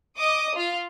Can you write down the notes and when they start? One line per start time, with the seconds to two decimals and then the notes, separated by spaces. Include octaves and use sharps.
0.17 D#5 D6 D#6
0.55 F4 F5